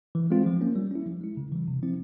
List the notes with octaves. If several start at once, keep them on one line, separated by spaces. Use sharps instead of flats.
E3
G#3 C4 F4
F3
A#3 C#4
G3
C#4 E4
F3
G#3 E4
C#3
E3 G3
C3
F3 C4 E4